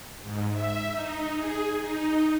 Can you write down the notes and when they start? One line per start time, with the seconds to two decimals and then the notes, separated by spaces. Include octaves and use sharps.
0.22 G#2
0.52 E5
0.91 D#4
1.37 G#4
1.79 D#4